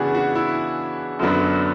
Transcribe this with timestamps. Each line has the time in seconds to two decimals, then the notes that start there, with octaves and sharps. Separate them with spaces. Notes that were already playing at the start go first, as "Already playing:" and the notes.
Already playing: C#3 E3 B3 D4 E4 F#4 G#4
0.15 F#4
0.35 E4
1.19 F#2 D3 F#3 B3 D4